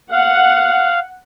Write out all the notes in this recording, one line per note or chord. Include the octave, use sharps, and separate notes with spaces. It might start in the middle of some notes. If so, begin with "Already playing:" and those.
F5 F#5